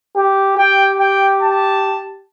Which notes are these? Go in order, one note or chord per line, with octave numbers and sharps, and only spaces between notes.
G4
G4 G5
G5
A5